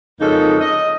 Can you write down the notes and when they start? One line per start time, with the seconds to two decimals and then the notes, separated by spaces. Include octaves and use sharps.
0.20 F2 C#3 G#3 A#3 D#4 A4
0.61 D#5